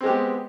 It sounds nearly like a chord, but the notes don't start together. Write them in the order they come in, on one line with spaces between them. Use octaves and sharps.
C4 G#3 G4 B3